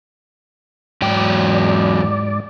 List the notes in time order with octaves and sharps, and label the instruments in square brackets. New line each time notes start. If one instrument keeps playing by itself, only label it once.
[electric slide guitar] E2 F#3 G5 [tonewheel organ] G#2 D5